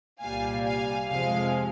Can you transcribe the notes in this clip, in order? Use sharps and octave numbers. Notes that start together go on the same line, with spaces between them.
C2 A#2 G3 F5 G#5
F5 G#5
F2 C3 F3 G#3 F5 G#5